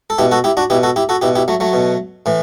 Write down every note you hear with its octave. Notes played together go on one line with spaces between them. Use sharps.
A4
B2 E4 G4
F#4 A4
E4 G4
D4 F#4
B2 E4 G4
F#4 A4
E4 G4
F#4 A4
B2 E4 G4
E4 G4
F#3 A3
F#3 A3
B2
A2 E3